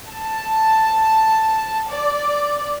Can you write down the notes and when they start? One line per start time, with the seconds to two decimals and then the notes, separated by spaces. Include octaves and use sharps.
0.11 A5
1.88 D5